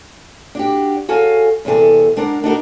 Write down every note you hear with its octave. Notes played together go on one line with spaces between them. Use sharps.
D4 F#4 G4
F#4 G#4 A4 C#5 F5 G#5
E2 C3 B3 G#4 A4
G#3 D4 A#4 F#5
D4 D#4 F#4 A#4